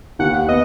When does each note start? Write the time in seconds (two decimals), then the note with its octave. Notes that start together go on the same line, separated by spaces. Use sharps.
0.19 D#2 F#5
0.49 B3 D#5